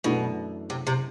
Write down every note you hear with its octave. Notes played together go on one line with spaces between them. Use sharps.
F#2 B2 E3 A3 D4 A4
C3
C3